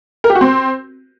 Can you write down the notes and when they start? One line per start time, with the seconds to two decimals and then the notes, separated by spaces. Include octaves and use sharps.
0.24 A#4
0.30 G4
0.35 F#4
0.41 C4